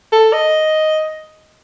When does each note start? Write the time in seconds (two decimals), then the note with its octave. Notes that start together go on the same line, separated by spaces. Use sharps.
0.12 A4
0.33 D#5